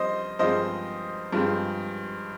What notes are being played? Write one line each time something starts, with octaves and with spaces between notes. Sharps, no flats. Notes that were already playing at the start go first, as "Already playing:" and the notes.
Already playing: G2 F3 C4 C5 D#5
G2 F3 G#3 C4 C5 D#5
G2 F3 G#3 C4